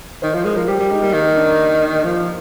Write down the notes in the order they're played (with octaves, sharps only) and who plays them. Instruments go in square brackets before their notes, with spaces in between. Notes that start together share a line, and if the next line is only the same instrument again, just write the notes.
[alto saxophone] D#3 [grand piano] C5
[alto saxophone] F3 [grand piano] C5
[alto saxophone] G#3 [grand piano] A#4
[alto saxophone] F3 [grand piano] A#4
[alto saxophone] G3 [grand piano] G4
[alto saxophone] G3 [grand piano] G4
[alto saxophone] G#3 [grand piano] D#4
[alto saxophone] G3 [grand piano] A#3
[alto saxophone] D#3 [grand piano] A#3
[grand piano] A#3
D4
D#4
[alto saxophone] F3